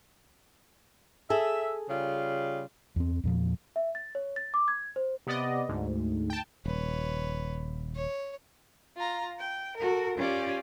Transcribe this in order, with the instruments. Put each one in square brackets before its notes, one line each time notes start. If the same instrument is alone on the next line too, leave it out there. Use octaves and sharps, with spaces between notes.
[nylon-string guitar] G#4 A4 [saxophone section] E5
[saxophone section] C#3 G3 F4
[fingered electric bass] E2 C4
E2 A#2 F3
[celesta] E5
A6
C#5
A6
D6
G#6
C5
[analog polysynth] C3 B3 D5 D#5
D2 G#2
G5 A5
[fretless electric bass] D#1 [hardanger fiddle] B4 C#5
[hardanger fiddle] C#5
[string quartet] F4 A#5
G5
F#4 A4 A#4
C#4 F4 G4 D5